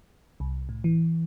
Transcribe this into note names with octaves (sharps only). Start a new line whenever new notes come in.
C2
A2
E3